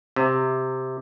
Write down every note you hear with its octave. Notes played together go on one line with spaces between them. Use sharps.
C3